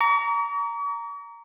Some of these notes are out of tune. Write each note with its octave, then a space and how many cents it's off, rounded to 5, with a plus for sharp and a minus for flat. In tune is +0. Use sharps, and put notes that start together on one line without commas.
A#5 -5 C#6 +45